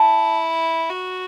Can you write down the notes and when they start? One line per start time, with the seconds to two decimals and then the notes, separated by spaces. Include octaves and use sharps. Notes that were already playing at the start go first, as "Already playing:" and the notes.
Already playing: E4 A5
0.90 F#4